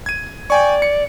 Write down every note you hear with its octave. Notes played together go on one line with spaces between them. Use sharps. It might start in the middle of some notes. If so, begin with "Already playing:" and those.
G#6 D#7
D5 G5 G#5 C#6
C#7